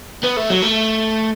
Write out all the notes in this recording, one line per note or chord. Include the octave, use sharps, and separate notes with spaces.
B3
A3
F#3
A3